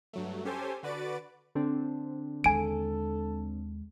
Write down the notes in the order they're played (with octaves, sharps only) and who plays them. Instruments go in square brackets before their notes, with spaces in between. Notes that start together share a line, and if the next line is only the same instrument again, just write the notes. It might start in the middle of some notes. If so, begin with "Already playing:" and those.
[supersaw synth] G2 F#3 A3
C#4 G4 A4 C5 G#5
D3 F#4 B4 D5 A6 D7
[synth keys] D3 C4 D4
[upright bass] D#2 G#3 [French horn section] A4 [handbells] G#5 D7